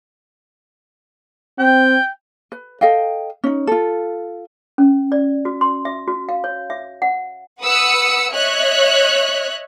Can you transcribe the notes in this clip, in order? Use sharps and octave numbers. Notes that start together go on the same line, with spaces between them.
C4 G5
B4
A4 D#5 F5 G5
C#4 D#4
F4 A4
C#4
D5
F#4
C6
E5
F#4
F5
C#5
E5
F#5
B4 F#5 D#6 E6 C#7
C#5 D#5 E5 F#6